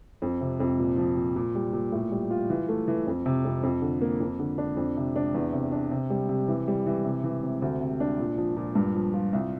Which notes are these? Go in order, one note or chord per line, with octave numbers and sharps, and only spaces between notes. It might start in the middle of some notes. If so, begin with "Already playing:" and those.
F2
C3
F2
A#2
F3
A#2
A#2
G3
A#2
A2
G3
F4
E3
A3
E3
F2
C3
F2
F2
D3
A#3
F2
D3
D4
F2
C3
D4
E2
C3
D4
C3
G3
C3
E3
G3
E3
C3
E3
C3
D2
C3
D4
A#2
F3
A#2
G2
F3
F4
C2